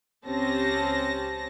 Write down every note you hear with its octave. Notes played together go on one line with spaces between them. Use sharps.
C#2 C4 C#4 G4 A5 A#6